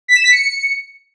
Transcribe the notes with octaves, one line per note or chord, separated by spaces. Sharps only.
B6
E7
B6
C#7